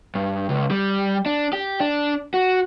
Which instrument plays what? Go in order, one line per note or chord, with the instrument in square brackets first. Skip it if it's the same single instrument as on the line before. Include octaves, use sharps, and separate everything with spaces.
[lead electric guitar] G2
C#2
G3
D4
G4
D4
F#4